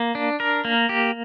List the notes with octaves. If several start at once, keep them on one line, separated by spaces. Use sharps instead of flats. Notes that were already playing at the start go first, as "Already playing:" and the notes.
Already playing: A#3
D4
A#4
A#3
G4